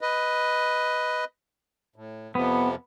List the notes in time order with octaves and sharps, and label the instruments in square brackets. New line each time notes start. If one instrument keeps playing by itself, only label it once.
[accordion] B4 D#5
A2
[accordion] F2 C3 F3 [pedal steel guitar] B3